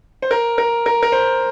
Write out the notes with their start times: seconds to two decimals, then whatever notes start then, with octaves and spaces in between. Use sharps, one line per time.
0.22 C5
0.31 A#4
0.58 A#4
0.86 A#4
1.03 A#4
1.12 C5